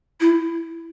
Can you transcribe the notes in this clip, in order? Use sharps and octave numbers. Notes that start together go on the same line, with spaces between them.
E4